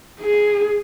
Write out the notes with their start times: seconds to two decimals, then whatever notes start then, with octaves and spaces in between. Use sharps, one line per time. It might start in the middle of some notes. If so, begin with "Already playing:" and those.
0.21 G#4